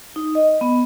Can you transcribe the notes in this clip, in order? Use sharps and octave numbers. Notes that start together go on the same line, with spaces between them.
D#4
D#5
B3